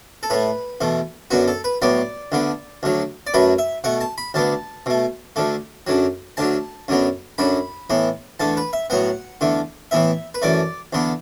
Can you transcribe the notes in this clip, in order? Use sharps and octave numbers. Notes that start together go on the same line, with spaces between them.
A4
A2 A3 B4
E2 B2 A3
F#2 D3 B3 F#4
A4
B4
A2 F#3 B3 D5
D2 D3 B3
D2 D3 F#3
D5
F#2 F#3 A3 B4
E5
B2 A3 F#5
A5
B5
D2 D3 B3 A5
B2 A3
D2 D3 A3
F#2 D3 F#3
D2 D3 F#3 A5
F#2 D3 F#3 B3
F#2 D3 F#3 B5
A2 E3 B3
E2 D3 A3 A5
B4
E5
A2 F#3 B3 F#5
E2 D3 A3
A2 E3 B3 E5
B4
F#2 E3 A3 D5
E2 D3 B3